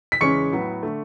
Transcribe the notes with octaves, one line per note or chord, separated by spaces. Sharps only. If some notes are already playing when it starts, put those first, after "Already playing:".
B6
E2 C#3 G#3 C#4 C#6 C#7
A2 F#3 B3
D3 A3